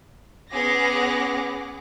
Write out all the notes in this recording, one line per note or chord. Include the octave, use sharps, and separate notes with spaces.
B3 C#4 G#4 F#5 D6 A#6